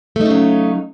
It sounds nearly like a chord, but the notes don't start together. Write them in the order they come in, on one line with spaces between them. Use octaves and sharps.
A3 D#4 C#3 F#3